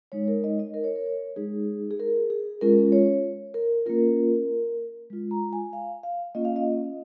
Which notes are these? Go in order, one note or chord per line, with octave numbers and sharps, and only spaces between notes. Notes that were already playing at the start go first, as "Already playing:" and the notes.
G#3 D#4 C#5
A#4
D#5
D#5
A#4
C#5
A#4
C#5
G#3 D#4 G#4
G#4
A#4
G#4
G#3 C#4 F4 A#4
C#5
A#4
A#3 C#4 F4 A#4
G#3 F4
A#5
G#5
F5
F5
A#3 C#4 F4 D#5
F5
D#5